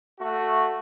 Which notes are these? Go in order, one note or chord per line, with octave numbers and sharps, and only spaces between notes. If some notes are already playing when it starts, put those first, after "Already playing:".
A3 F#4